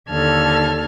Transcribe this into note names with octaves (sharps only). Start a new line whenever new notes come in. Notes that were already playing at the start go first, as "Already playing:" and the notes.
D#2 D3 A4 A5 F6 G#6